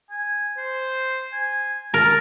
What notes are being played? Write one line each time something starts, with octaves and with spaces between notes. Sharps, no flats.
G#5
C5
G#5
A#4 A5